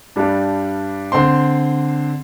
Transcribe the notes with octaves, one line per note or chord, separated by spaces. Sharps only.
G2 G3 D4
D3 C4 C6